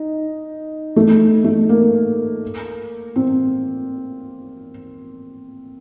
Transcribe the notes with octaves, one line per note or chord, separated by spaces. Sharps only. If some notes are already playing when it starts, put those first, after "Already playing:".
Already playing: D#4
A3
A3
A#3
C4